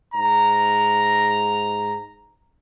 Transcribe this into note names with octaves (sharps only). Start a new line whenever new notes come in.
G#2 A#5